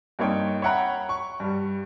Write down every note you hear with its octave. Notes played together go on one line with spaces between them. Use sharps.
G2 A#3 C4 D#4 C#5 G5
C#5 E5 F#5 G5 A#5 B5
C#6
G2 G3